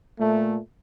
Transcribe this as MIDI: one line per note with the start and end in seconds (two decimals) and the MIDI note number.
0.19 0.57 46
0.19 0.57 57